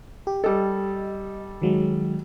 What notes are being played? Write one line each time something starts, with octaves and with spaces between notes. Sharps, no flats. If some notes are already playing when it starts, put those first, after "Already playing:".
G4
G3 A4 D#5
D#3 F#3 G#3